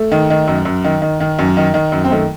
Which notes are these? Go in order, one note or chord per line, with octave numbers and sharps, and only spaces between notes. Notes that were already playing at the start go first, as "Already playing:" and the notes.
Already playing: A3
D#3
D#3
F#2
F#2
D#3
D#3
D#3
F#2
D#3
D#3
F#2
C4
D#3 A3